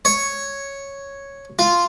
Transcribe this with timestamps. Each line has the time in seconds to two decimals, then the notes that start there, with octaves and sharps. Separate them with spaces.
0.05 C#5
1.59 F4